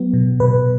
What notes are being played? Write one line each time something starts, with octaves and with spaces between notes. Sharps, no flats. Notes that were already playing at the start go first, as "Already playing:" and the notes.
Already playing: F#3 B3
B2
B2 B4